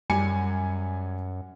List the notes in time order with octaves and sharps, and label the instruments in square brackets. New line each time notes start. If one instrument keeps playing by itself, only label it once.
[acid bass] F#2 [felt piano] G3 G#5 C#7